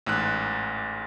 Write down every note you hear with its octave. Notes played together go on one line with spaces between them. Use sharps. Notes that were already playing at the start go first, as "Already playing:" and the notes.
A1 G#2 F#6